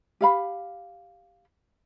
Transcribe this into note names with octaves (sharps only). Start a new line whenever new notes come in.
G4 F5 B5